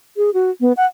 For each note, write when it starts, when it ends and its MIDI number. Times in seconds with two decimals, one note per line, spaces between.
0.17 0.30 68
0.34 0.50 66
0.61 0.73 59
0.77 0.86 78